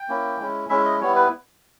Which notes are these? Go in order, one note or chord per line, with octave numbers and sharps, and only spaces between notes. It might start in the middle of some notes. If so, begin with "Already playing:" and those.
Already playing: G5
A#3 C#4 E4
G#3 C#4 E4
G#3 C#4 E4 E5
D#5
G3 B3 E4 C#5
B4